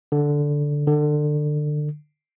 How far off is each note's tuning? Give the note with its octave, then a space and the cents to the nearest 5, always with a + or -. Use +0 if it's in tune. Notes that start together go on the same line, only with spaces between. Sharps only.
D3 -5
D3 +25